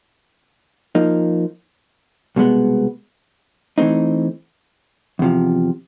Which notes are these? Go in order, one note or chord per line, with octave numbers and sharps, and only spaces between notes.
F3 A#3 D#4
C2 B2 G#3 B3
E3 A3 C4 D#4
E2 C3 F3